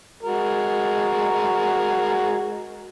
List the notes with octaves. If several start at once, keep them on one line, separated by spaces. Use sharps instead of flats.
G#3 F#4 A#4